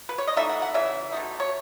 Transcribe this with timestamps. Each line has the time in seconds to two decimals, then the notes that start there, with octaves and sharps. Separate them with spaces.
0.09 B4
0.18 C#5
0.27 D#5
0.37 E3 A3 D#4 E5
0.49 F#5
0.62 F#5
0.74 C#3 E3 E5
1.12 B2 A3 D#4
1.40 C#5